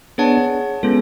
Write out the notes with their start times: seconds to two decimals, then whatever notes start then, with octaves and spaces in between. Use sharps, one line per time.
0.18 B3 D4 G#4 C#5 F#5 A5
0.83 G#3 B3 C#4 F4 A4